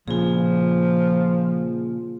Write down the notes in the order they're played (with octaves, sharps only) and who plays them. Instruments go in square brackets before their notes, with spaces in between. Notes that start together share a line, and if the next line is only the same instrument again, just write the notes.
[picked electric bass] A#2 C#3 [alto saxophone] F3 [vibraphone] F4 G#4